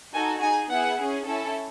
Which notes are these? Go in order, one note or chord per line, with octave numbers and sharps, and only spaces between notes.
D#4 F#4 A4 G#5
D#4 G#4 G#5
B3 E4 G#4 F#5
C#4 G#4
C#4 E4 A4